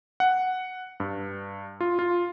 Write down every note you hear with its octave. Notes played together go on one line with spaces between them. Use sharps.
F#5
G2
F4
F4